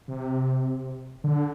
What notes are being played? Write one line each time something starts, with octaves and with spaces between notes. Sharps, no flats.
C3
D3